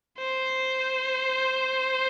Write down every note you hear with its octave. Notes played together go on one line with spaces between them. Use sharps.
C5